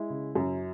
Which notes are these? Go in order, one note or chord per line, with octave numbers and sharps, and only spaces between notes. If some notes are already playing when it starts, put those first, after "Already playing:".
Already playing: G#3 E4
C#3
F#2